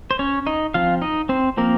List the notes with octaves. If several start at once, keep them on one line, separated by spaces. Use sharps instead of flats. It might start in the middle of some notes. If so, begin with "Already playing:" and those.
C5
C#4 C#5
D#4 D#5
F3 C4 F4 F5
D#4 D#5
C4 C5
F3 A#3 C4 A#4